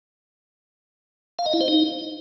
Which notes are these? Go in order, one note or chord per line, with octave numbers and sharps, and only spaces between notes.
F5
D#5
E4
C5
D#4